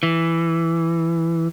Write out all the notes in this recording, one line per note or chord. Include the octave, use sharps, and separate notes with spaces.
E3